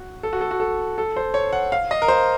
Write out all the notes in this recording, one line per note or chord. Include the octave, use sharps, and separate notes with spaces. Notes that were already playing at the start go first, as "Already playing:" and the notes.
Already playing: F#4
A4
F#4
A4
F#4
A4
A4
C5
C#5
F#5
F5
D#5
A#4
C5